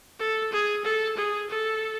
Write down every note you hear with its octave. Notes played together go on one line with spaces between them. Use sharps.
A4
G#4
A4
G#4
A4